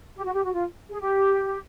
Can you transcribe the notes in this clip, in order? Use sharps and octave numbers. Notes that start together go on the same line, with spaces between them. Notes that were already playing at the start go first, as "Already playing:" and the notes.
G4
F#4
G4
F#4
F4
G#4
G4